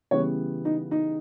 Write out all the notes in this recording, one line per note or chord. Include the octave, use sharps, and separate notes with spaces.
C#3 E3 G3 B3 C#5
D#4
D#4